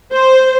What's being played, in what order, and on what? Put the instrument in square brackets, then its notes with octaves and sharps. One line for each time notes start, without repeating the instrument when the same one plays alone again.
[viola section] C5